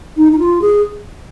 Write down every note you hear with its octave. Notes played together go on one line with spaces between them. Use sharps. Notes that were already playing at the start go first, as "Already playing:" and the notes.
D#4
D#4
F4
G#4